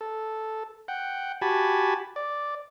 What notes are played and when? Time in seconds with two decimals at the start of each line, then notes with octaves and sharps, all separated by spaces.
0.01 A4
0.88 F#5 G5
1.42 F#4 G4 G#5 A5 B5
2.16 D5